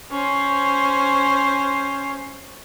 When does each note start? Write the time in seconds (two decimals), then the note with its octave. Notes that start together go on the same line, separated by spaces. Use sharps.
0.11 C#4 C5